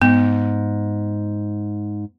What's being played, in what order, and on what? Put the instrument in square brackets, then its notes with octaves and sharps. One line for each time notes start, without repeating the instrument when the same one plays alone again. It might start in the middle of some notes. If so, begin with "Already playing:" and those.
[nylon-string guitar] G#2 [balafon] B3